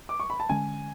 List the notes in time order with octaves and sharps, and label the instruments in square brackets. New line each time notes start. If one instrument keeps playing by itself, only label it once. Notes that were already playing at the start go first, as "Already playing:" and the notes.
[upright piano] D6
C#6
B5
A5
[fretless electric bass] D3 G#3 C#4 [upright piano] G#5